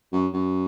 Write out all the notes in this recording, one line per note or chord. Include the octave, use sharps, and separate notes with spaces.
F#2
F#2